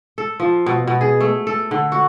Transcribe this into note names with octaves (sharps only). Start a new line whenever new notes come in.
A4
F3
B2
B2
G#4
A3
A4
D3
F#4